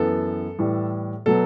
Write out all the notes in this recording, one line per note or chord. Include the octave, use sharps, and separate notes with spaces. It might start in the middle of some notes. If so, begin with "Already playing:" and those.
Already playing: F#2 E3 B3 A4
A2 E3 G3
B2 F#3 B3 A4